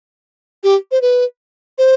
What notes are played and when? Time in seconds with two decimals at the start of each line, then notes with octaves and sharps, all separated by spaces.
0.64 G4
0.91 C5
1.02 B4
1.78 C5